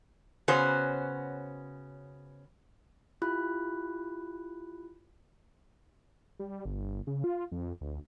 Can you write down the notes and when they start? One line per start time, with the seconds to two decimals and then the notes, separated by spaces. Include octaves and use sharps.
0.48 C#3 B3 C#4 F#4 C5
3.22 E4 F4 G4 B5 F#6
6.39 G3
6.65 G1
7.07 C#3
7.24 F4
7.52 F2
7.81 D2